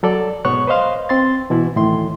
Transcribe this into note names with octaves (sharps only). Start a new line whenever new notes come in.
F#3 A4 D5
G#2 B2 B3 C#5 C#6 F#6
B4 C5 D#5 F5 C6
C4 C6 A6
B2 E3 E4 F#4
D2 A2 D#3 E3 C6